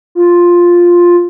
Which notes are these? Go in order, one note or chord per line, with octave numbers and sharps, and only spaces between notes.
F4